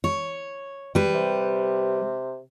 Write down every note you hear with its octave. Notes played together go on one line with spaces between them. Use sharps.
C#5
G3 B4
C3